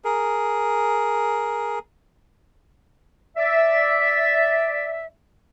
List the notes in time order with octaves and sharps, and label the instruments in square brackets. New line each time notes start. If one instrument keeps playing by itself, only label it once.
[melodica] G#4 A#4
[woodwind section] D5 E5